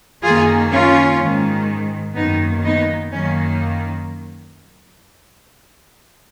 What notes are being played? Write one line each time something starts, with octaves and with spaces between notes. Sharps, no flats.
F#2 D#3 A#3 F4 G#4
C#4 F4
G#2 D#3 G#3
F#2 D#3 A#3 B3 D#4
B3 D#4
F#2 D#3 A#3 C#4